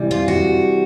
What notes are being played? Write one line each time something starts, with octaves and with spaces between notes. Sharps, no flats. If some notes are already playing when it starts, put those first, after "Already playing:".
Already playing: C3 E3 G3
F4
F#4